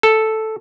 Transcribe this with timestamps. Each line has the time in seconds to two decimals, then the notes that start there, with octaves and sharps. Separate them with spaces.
0.03 A4